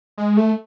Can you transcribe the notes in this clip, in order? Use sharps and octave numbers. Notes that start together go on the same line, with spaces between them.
G#3
A3